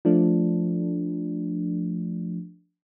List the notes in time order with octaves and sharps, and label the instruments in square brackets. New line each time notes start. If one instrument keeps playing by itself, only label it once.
[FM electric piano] F3 A3 D4